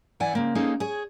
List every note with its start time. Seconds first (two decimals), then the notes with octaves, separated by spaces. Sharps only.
0.20 E3 B3 E4 D5 F#5 G#5
0.33 C#3 A#3 C4
0.55 A#3 C#4 D#4 G#4 A4 C5
0.80 G#4 C#5